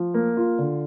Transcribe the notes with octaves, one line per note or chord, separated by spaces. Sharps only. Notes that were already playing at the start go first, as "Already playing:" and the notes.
Already playing: F3
A#3
F4
D3